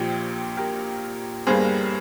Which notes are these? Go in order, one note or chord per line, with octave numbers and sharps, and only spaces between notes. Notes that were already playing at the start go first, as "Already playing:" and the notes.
Already playing: A#1 A#2 F3 G4
G4 A#4
G1 G2 G3 A#3 G#4 C5